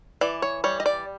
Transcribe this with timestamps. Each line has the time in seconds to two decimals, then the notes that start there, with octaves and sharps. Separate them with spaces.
0.21 E3 D5
0.42 C#5
0.64 G3 C#5
0.80 D#5
0.86 D5